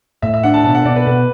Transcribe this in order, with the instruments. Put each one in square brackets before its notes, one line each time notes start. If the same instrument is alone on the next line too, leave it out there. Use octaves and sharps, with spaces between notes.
[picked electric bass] A2 [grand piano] E5
[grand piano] E5
[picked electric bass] D4 [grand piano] F#5
[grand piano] A5
[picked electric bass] B2 [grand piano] A5
[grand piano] F#5
[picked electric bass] B2 [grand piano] D5
[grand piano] B4
[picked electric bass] B2 [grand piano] B4